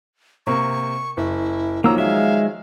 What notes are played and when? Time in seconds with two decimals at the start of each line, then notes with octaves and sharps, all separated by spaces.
0.47 C3 A#3 C#6
1.17 F#1 E4
1.84 D#3 F3 F#3 A#3 A#5 E6
1.98 G#3 E5 F5